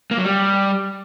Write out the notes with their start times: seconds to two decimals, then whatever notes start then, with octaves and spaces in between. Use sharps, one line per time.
0.11 A#3
0.18 F#3
0.24 G3